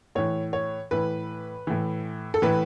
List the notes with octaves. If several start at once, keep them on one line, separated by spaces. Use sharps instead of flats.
A2 E3 C#5
C#5
A2 E3 B4
A2 E3
A4
A2 E3 B4